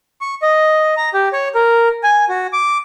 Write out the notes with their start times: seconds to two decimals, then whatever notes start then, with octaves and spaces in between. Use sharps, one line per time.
0.21 C#6
0.42 D#5
0.97 A#5
1.14 G4
1.33 C#5
1.55 A#4
2.03 G#5
2.29 F#4
2.53 D6